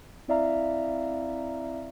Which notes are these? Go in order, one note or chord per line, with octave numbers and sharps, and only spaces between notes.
C4 E4 D5 E5 F5 A#5